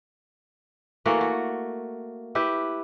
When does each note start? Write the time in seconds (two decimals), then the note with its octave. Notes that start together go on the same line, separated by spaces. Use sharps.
1.05 E3 A3 A#3 F#4
1.21 F#4
2.35 E4 G4 B4